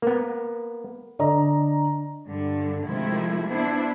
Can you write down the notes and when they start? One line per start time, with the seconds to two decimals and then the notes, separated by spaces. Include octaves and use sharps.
0.02 A#3 B3
1.19 D3 D5 D#5 A#5
2.27 G2 D3
2.86 C3 D#3 F3 G#3 A3 E4
3.49 B3 D4 E4 C5